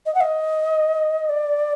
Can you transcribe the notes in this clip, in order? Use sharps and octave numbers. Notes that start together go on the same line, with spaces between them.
D#5
F#5
D#5
D5